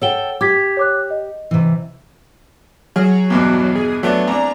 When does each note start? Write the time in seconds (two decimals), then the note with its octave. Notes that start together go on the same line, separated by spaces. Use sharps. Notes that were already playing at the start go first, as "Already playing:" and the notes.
0.02 A4 C#5 F#5 G5 G7
0.41 G4 D6 G#6 B6
0.77 C#5 D6 F#6
1.10 D#5
1.51 C3 E3
2.96 F#3 G#4 F6
3.30 E2 G2 B2
3.75 G#4
4.03 F#3 A3 B3 D4
4.28 C2 D4 A#5